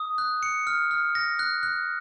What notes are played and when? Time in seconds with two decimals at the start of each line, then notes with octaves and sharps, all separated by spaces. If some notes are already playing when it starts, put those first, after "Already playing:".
Already playing: D#6
0.18 F#6
0.43 C#7
0.67 F6
0.91 F6
1.15 A#6
1.39 F#6
1.63 F#6